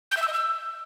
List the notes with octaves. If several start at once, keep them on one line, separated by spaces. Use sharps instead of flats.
G6
E5
E6
D#5
E6